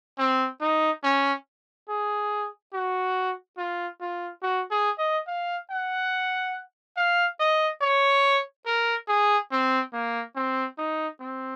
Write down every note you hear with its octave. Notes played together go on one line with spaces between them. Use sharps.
C4
D#4
C#4
G#4
F#4
F4
F4
F#4
G#4
D#5
F5
F#5
F5
D#5
C#5
A#4
G#4
C4
A#3
C4
D#4
C4